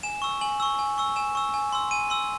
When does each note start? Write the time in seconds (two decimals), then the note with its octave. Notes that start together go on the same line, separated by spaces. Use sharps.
0.03 G#5 E7
0.22 C#6 E6
0.41 G#5 F#7
0.60 C#6 E6
0.79 G#5
0.98 C#6 E6
1.16 G#5 E7
1.35 C#6 E6
1.54 G#5
1.73 C6 E6
1.91 G#5 D#7
2.10 C6 E6